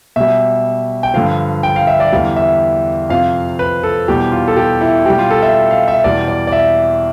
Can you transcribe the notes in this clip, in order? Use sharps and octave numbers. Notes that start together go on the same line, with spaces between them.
B2 G3 E5
G5
G2 D3 F3 F5
G5
F5
E5
D5
E2 D3 G3 F5
E5
F2 C3 F3 F5
B4
A4
E2 B2 G3 G4
F4
A4
G4
E4
B2 G3 G4
F4
A4
E5
F5
E5
E2 B2 G3 D5
D5
D5
E5